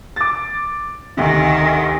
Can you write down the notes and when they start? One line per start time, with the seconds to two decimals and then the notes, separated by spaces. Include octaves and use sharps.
0.16 D6 A6
1.17 D2 C3 D#3